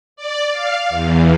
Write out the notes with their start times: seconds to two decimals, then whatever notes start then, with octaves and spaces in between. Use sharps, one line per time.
0.16 D5
0.51 F5
0.89 E2